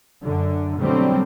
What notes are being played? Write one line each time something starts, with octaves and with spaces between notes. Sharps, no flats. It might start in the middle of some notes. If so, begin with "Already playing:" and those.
F#2 D3
B2 D3 F#3 G3 A3 C4